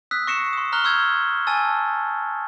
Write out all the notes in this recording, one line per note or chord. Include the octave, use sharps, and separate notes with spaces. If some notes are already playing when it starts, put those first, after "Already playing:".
D#6 E6 F#6 B6
C#6 A#6 C7 C#7 E7
C6 D#6
A#5 F6 F#6 G7
C6 C#6 E6 G6 G#6
G#5 A5 E6 A6